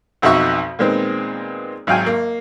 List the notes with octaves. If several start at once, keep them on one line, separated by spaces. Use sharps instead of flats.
B1 F2 D#4 F#4 E5 C#6
A#2 D#3 G#3 B3 C4
G#1 F#3 F5 G5 G#5
A#3